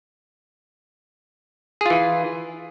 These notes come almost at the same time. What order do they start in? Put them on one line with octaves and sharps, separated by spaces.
G#4 F4 E3